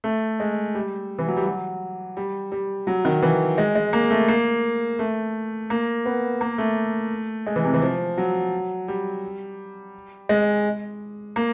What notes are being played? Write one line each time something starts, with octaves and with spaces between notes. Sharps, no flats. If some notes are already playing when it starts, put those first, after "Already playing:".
A3
G#3
G3
E3
F#3
G3
F#3
G3
G3
F#3
D#3
E3
G#3
G#3
A#3
A3
A#3
A3
A#3
B3
A#3
A3
G#3
E3
C3
E3
F3
F#3
G3
G#3
A#3